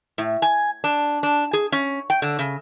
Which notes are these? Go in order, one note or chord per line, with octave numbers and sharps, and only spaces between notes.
A2
G#5
D4
D4
G#4
C#4
G5
D3
C#3